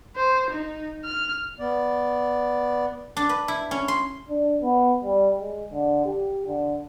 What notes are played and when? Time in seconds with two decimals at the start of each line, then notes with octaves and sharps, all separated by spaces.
0.16 C5
0.50 D#4
1.05 F6
1.59 B3 D5
3.17 D4
3.29 B4
3.48 E4
3.71 C#4
3.88 C6
4.29 D4
4.62 B3
5.04 G3
5.40 G#3
5.72 D3
6.05 G4
6.46 D3